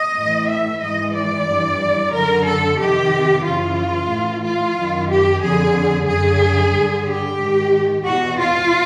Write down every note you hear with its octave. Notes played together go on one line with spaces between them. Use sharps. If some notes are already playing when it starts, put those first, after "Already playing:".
Already playing: D#5
A2 E3
E5
G#2 E3 D#5
D5
G2 E3
F#2 D3 A#4
A4
F2 C3 D#3 G4
F#2 C#3 E3 F4
A2 E3
F4
F#2 D#3
G4
F2 D3 G#4
F#2 D3 G#4
G2 D3
G4
G#2 D#3
E2 B2 F#4
F4